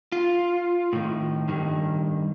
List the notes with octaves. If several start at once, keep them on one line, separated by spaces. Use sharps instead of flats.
F4
A2 D#3
G2 D#3